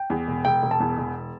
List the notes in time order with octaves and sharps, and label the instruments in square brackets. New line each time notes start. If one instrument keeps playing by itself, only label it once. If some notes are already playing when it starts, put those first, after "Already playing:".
Already playing: [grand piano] G5
[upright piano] E2
E1
[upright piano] E1 [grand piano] G5
[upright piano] E1
[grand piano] A5
[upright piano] E2
E1